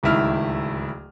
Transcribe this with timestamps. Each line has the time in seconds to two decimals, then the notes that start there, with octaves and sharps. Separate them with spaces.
0.03 D1 C#2 D#3 E4 F6